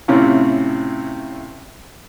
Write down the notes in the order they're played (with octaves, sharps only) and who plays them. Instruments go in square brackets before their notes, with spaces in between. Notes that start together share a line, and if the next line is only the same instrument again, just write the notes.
[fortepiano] A2 C3 C4 C#4 E4 F4